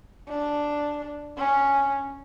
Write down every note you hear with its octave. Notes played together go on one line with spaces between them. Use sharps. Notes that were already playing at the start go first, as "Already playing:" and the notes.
D4
C#4